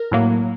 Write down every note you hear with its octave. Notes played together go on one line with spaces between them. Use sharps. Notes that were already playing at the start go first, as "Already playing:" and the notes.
Already playing: A#4
A2 F#3 A#3